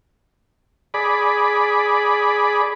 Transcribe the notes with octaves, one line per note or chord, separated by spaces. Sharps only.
G#4 D5 B5